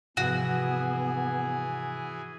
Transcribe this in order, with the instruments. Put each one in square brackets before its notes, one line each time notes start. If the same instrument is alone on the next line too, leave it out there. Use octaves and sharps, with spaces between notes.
[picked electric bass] G#2 C3 F3 [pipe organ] E3 G#4 G#5 [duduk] B3 [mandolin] F#4